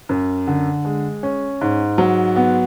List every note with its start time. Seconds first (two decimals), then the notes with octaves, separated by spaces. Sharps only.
0.09 F#2
0.48 D3
0.85 G#3
1.23 C#4
1.61 G#2
1.98 F#3
2.36 B3